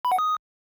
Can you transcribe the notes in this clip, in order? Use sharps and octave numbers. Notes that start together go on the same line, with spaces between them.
B5
F#5
D#6